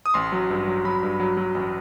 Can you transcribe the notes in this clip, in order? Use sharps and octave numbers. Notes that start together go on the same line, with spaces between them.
D#6
A1 C6
F#3
G2
F#3
F#3 B5
G2
F#3
F#3
A1